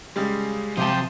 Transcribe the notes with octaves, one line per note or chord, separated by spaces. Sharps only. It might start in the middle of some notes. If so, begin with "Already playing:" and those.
C#3 G3 G#3
C3 F3 F#3 G4 A5 C6 D#6